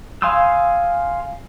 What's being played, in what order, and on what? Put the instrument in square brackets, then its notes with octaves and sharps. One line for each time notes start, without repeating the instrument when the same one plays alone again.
[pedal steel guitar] F5 G#5 C6 D#6 E6